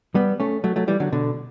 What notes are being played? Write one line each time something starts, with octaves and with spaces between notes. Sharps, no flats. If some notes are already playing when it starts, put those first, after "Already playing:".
G3 B3
A3 C#4
F#3 A3
F#3 A3
E3 G3
D3 F#3
B2 D3